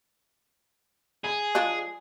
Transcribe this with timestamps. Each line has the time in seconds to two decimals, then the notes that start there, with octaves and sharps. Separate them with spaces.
1.25 G#4
1.55 F3 G#3 D4